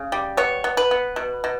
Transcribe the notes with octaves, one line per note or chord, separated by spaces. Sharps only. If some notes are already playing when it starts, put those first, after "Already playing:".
Already playing: C#3
G3
B3 C#5
B3
B4
B3
B2
B2